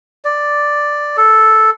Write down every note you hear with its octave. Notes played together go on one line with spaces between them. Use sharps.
D5
A4